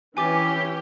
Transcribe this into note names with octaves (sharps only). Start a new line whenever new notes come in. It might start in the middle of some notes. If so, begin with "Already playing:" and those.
E3 C#4 G4 G#5 D6 A6